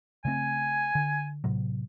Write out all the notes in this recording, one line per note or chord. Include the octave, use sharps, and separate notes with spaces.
C#3 A3 C4 G#5
D3
A2 C3 F#3